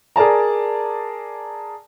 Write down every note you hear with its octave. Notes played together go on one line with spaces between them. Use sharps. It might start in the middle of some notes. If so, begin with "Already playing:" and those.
G#4 A#4 D5 A5 A#5